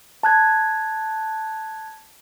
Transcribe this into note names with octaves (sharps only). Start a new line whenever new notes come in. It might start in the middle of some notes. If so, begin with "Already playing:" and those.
A5 F#6 G#6